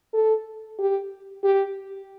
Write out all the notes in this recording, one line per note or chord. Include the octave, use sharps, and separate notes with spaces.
A4
G4
G4